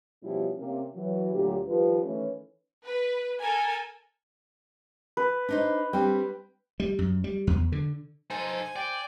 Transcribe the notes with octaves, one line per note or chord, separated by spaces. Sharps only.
B2 F3 G3 C#4 E4 F#4
C3 A#3 C#4
E3 F#3 F#4
D2 A#2 D3 F#3 G4
D#3 F3 G3 F4 B4
D#3 E3 A3 C#4
B4
A4 A#4 G#5
B4
D4 D#4 C5
G3 C4 D4 G5
G3
F#2
G3
E2
D3
D#4 A4 C5 G#5
D5 G5